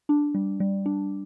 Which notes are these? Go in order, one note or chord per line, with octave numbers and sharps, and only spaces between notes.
D4
G3
G3
D4